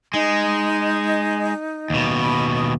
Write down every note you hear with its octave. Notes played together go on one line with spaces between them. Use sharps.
G#3 D#4
D#2 B2
B5
D#6